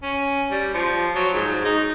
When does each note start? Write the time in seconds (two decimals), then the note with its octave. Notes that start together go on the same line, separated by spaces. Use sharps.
0.03 C#4
0.51 G3
0.74 F3
1.16 F#3
1.34 G#2
1.65 D#4